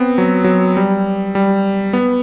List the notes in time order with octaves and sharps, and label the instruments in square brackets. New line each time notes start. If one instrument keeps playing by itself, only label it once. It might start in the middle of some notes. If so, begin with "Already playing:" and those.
Already playing: [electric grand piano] B3 C4
F#3
F#3
G3
G3
B3